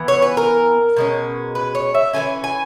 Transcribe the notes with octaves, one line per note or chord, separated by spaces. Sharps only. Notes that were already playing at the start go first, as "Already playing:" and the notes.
Already playing: E3 B3
C#5
B4
A#4
B2 G#3 C#4
B4
C#5
E5
E3 G#3 C#4 G#5
G#5